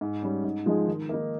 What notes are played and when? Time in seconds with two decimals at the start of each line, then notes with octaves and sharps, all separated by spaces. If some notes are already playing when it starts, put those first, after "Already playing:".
0.01 G#2
0.22 G3 C#4
0.44 G#2
0.66 F3 G#3 D#4 G#4
0.87 D#3
1.09 A#3 D#4